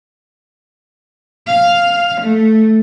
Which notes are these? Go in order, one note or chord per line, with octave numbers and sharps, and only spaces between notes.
F5
A3